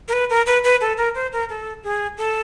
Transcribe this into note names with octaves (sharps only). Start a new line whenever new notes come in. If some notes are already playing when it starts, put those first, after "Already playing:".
A#4
B4
A#4
B4
B4
A4
A#4
C5
A#4
A4
G#4
A4